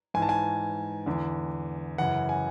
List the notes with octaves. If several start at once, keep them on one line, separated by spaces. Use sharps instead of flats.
G#2 E3 G#5
A5
G#5
E2 D3
F#2 C#3 E3 F#5
G#5